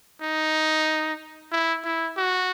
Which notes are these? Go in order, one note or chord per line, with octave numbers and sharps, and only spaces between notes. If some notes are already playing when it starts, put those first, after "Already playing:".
D#4
E4
E4
F#4